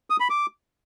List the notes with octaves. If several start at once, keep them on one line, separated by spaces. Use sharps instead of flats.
D#6
B5
D6